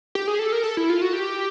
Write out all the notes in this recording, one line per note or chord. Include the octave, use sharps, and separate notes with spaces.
G4
G#4
A4
A#4
A4
E4
F4
F#4
G4